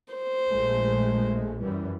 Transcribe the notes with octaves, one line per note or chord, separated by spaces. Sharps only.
C5
A#1 G#3 A3
F#2 E3 G3